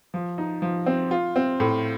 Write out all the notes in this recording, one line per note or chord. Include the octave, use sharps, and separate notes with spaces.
F3
D#4
F3
C4
F4
C4
A2